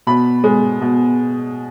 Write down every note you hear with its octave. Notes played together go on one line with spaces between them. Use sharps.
B2 B5
G#3
B2